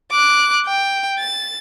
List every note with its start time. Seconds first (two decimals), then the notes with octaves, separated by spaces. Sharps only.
0.11 D6 F#6
0.66 G5
1.19 A6